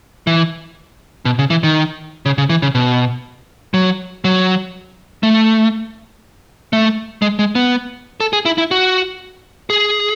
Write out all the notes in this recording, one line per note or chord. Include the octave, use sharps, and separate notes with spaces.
E3
B2
C#3
E3
D#3
C#3
C#3
E3
C#3
B2
F#3
F#3
A3
A3
G#3
G#3
B3
A4
G#4
E4
E4
F#4
G#4